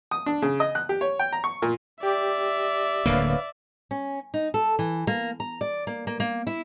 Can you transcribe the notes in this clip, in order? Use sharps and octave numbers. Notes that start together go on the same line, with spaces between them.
D#6
D4
C#3
D#5
F#6
G4
C#5
G5
A#5
C#6
A#2
G4 D5 E5
D1 D3 A#3 B4 C#5 F5
C#4
D#4
A4
E3
A#3
A#5
D5
A#3
A#3
A#3
E4